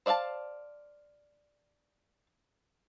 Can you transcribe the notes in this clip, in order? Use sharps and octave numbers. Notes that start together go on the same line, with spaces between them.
C5 D5 E5 F5 A5